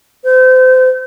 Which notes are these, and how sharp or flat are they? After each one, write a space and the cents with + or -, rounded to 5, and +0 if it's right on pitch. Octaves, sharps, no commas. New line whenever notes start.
C5 -30